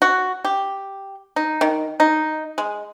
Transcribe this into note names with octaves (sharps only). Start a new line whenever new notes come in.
F#4
G4
D#4
D#3
D#4
G#3